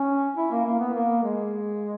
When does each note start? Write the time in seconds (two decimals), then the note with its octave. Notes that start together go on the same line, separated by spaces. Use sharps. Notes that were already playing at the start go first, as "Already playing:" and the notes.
Already playing: C#4
0.37 E4
0.51 A#3
0.65 A#3
0.80 B3
0.94 A#3
1.23 G#3